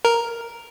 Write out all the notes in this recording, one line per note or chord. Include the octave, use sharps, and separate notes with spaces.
A#4